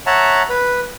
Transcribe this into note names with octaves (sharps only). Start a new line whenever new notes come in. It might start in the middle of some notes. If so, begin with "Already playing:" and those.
C#5 E5 F#5 A5 A#5
B4